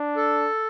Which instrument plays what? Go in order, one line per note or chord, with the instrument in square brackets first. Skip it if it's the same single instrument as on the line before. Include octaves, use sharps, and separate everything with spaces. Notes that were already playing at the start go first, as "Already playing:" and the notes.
Already playing: [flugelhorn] D4
[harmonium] A4